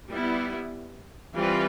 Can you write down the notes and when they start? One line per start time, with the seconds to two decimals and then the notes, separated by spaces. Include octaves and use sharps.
0.09 G3 B3 E4
1.35 E3 G3 C4 F4 B4